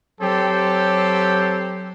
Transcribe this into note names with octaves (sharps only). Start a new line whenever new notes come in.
F#3 C4 G4 A4